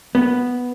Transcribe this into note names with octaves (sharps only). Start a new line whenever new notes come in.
B3